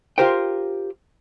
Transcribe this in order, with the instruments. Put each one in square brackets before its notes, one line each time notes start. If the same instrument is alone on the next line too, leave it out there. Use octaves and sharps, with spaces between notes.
[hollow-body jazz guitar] F4 G4 A#4 C5 G5